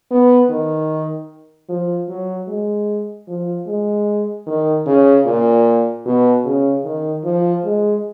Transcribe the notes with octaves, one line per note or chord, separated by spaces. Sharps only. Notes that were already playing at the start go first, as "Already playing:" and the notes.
B3
D#3
F3
F#3
G#3
F3
G#3
D#3
C#3
A#2
B2
C#3
D#3
F3
G#3